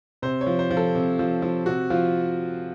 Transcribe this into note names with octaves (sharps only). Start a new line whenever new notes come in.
C3 C5
C#5
F3
C5
F3
A4
C3
F3
F3
C3 F#4
F3 F4